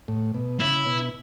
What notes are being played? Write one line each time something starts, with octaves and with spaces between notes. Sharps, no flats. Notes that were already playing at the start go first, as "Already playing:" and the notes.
A2
B2
C#3 E4
B2